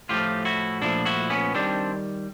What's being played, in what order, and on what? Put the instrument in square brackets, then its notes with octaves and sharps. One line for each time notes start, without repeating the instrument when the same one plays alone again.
[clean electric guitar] A2 F3 A3 F4 G4
E4 F#4
A#2 F3 A3 D4 E4
E4 F#4
B3 C#4
D#3 G3 C4 D4